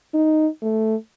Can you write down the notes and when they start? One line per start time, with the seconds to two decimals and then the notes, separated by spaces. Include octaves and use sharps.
0.14 D#4
0.62 A3